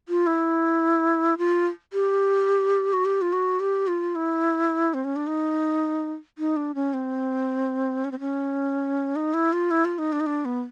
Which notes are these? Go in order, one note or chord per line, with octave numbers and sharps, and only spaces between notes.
F4
E4
F4
G4
F#4
G4
F4
F#4
G4
F4
E4
C4
C#4
D4
D#4
D#4
D4
C#4
C4
C#4
C4
C#4
D#4
E4
F4
E4
F4
D#4
D4
D#4
D4
B3